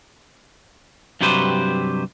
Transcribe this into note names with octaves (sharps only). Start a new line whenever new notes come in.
G2 C3 F#3 G4 B4 C5